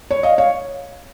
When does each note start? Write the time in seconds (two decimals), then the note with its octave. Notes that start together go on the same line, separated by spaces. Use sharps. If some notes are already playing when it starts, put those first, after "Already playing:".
0.11 C#5
0.23 D#5 F5
0.38 C#5 F5